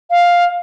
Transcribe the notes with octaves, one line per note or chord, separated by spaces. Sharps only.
F5